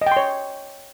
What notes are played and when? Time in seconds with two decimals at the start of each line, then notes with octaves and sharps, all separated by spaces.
0.01 D#5
0.07 G5
0.12 C6
0.17 C#5